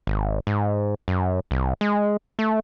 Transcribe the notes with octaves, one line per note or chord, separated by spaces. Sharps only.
G#1
G#2
F#2
C2
G#3
A3